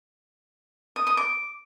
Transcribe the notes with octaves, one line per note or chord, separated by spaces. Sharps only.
D#6
D#6
D6